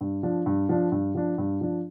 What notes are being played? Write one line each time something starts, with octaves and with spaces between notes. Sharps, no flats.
G2
F3 D4
G2
F3 D4
G2
F3 D4
G2
F3 D4